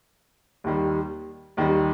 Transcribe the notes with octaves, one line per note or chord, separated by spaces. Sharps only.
D#2 D#3 G3
D#2 D#3 G3